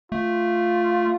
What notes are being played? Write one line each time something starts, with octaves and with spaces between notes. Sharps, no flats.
A3 F4